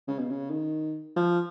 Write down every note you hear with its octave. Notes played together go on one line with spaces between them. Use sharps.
C#3
B2
C#3
D#3
F3